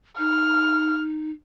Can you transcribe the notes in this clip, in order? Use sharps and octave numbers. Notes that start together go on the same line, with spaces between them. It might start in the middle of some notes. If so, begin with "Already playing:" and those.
D#4 F6